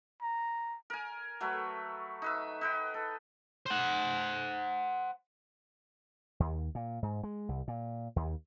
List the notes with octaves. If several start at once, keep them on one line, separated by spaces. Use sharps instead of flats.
A#5
A#4 G#5
F#3 A3 A#4 B4
D#4 B4 E5
D#4 B4 G5
A4
C5 F#5
D#2
A#2
G#2
G#3
C2
A#2
D#2